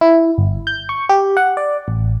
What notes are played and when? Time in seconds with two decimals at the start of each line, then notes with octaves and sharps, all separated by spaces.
0.01 E4
0.38 G1
0.67 G6
0.89 C#6
1.09 G4
1.37 F#5
1.57 D5
1.88 A1